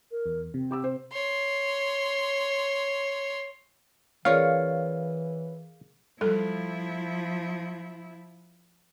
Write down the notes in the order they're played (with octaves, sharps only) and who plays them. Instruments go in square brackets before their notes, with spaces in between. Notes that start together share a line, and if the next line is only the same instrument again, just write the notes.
[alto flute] A#4
[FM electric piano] E2
[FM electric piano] C3 [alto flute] C4
[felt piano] G4 D6 E6
C5
[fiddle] C#5 C6
[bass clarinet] E3 [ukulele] C#4 F4 C#5 [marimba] G#4 A#4 D5 [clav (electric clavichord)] F5
[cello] F3 E4 [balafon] G3 A4